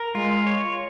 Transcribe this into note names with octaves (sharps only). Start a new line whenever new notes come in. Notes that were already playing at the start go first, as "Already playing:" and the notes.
Already playing: A#4
G#3 F4
C#5